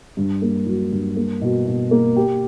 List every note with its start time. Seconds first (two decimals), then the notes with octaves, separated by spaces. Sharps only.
0.17 G2
0.42 A#3
0.66 F#3
0.92 G2
1.16 A#3
1.41 B2
1.67 B2
1.91 A#3
2.16 G4